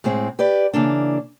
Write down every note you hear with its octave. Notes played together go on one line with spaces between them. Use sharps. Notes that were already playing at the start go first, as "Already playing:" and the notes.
A2 G#3 C4 G#4
G4 B4 D5
C#3 E3 A#3 D4